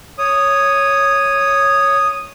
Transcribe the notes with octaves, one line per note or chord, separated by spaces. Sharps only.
C#5 D#6